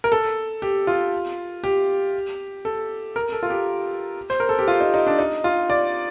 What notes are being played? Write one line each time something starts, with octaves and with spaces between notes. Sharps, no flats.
A#4
A4
G4
F4
G4
A4
A#4
A4
F4
G4
C5
A#4
A4
G4
F4
D#4
D#4
D4
D#4
F4
D5